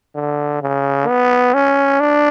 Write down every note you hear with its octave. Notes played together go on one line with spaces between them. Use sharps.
D3
C#3
B3
C#4
D4